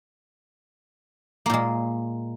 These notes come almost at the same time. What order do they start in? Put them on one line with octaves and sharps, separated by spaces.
A#3 A#2 G#3